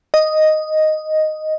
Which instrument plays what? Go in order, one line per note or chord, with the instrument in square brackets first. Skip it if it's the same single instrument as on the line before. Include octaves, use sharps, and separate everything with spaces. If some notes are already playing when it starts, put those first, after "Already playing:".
[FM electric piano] D#5